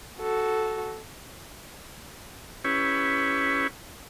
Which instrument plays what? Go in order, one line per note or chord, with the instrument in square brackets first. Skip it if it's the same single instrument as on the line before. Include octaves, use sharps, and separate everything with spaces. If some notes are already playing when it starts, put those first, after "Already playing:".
[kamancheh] F#4 A4
[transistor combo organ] C#4 E4 G4 B4 C#5